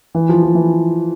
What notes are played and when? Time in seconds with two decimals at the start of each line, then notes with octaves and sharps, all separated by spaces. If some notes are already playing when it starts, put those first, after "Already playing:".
0.15 E3
0.29 F3
0.43 F3
0.55 E3